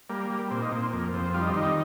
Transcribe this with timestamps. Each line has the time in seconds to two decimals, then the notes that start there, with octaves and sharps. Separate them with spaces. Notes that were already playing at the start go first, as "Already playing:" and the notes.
0.10 G3 A#3
0.30 G3
0.51 A#2 C4
0.62 D#4
0.72 A#2 C4
0.93 F2 A#3
1.14 F2 C4
1.34 G3 F4
1.42 D#4
1.49 C4
1.55 D#3 D#4